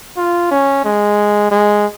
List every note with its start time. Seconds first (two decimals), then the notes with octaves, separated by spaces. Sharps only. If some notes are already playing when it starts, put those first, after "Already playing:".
0.17 F4
0.51 C#4
0.84 G#3
1.51 G#3